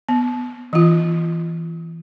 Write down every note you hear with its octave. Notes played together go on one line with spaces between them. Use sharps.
B3
E3 F4